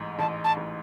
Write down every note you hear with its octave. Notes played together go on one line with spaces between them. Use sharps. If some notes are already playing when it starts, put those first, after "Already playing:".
Already playing: A1 G#2
A1 A5
A5
A1